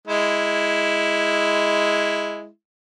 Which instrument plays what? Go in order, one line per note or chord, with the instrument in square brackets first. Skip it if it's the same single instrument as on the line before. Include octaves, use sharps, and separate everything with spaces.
[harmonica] G#3 E4